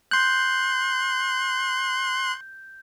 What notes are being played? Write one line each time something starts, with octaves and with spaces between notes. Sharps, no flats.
C6 F#6 G6